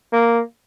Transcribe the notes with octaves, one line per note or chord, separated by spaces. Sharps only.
A#3